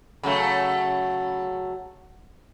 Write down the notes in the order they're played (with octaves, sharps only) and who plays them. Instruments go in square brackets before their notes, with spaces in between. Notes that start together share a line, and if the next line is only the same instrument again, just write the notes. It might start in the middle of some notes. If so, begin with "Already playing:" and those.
[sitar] C#3 F#3 A3